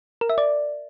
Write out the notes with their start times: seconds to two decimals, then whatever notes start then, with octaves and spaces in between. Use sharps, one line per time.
0.21 A#4
0.29 E5
0.38 D5